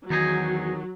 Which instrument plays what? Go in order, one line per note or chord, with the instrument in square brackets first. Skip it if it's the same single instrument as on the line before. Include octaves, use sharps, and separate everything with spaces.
[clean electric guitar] E2 D#4 G#4 [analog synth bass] D#3 [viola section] F#3